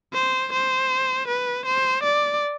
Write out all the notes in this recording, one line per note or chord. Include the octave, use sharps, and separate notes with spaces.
C5
C5
B4
C5
D5